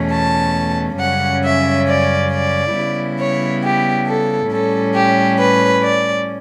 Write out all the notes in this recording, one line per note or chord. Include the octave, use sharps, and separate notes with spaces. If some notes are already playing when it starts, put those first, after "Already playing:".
Already playing: E2 B2 A3 C#4
A5
F#2 C#3 G3 C#4 F#5
E5
D5
D5
C#3 G3 B3 E4
C#5
G4
A4
A2 G3 C#4 A4
G4
B4
D5